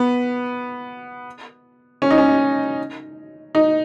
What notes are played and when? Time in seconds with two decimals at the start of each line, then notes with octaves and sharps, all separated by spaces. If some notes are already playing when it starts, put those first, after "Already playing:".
Already playing: B3
2.02 C#4
2.11 D#4
2.18 C#4
3.55 D#4